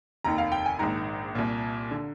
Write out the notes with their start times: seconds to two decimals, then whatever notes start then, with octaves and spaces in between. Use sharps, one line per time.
0.24 F1 D#2 D#3 A#5
0.38 F5
0.52 G5
0.66 G#5
0.79 A#1 G#2 D#3 A#5
1.35 C2 A#2
1.91 D3